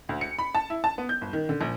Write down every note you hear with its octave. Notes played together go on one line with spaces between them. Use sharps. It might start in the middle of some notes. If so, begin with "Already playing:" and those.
D2
C#7
B5
A5
E4
A5
B3
G6
G1
D#3
D3
A#1